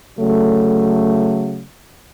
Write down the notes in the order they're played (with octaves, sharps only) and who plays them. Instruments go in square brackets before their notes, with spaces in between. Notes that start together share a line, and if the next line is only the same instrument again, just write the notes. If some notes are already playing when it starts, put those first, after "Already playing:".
[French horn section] C#3 F#3 A3